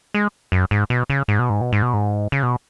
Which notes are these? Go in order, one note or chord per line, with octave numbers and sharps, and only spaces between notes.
G#3
F#2
G#2
B2
C#3
G#2
B2
G#2
B2
G#2
B2
G#2
C#3
B2